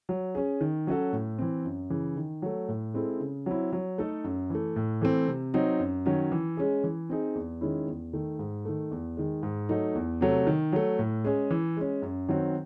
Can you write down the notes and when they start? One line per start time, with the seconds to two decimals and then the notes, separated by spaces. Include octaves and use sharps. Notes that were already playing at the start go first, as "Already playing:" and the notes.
0.09 F#3
0.35 C#4 G#4
0.61 D#3
0.87 F#3 C#4 F#4 A4
1.13 A2
1.39 E3 C4
1.65 F#2
1.90 C#3 E3
2.16 D#3
2.42 F#3 A3
2.68 A2
2.94 G#3 C4 E4 A4
3.20 C#3
3.46 F#3 C4 E4
3.73 F#3
3.98 A3 D#4 A4
4.24 F#2
4.50 E3 A3
4.76 A2
5.01 E3 A3 C4
5.28 C3
5.54 F#3 C4 D#4
5.80 F#2
6.06 D#3 F#3 C#4
6.32 E3
6.57 G#3 C#4 G#4
6.84 E3
7.09 C4 D#4 G#4
7.35 E2
7.61 D#3 G#3 C#4 E4
7.87 E2
8.13 D#3 A3
8.39 G#2
8.65 D#3 A3
8.91 E2
9.17 D#3 G#3
9.43 G#2
9.69 F#3 A3 D#4
9.95 E2
10.21 C3 F#3 A3
10.47 D#3
10.73 F#3 A3
10.99 A2
11.24 G#3 C#4 G#4
11.51 E3
11.77 G#3 C#4
12.02 F#2
12.29 D#3 F#3 C4 F#4